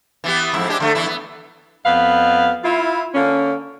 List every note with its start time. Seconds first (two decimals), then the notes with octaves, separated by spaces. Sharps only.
0.24 E3 B3 G4
0.54 F2 G#2 E4
0.68 G#3 D4 G4
0.80 D3 A3
0.95 E2 E3 E4
1.07 B3
1.85 F2 B3 B4 F5
2.64 E4 F4
3.14 D3 A#3 C#4